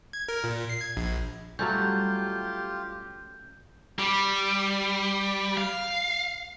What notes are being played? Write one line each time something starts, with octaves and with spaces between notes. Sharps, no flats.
G#6
A#4
A#2
C7
G#6
A#1
F#3 G3 A3 C#4 F4 G4 G6
G3
F5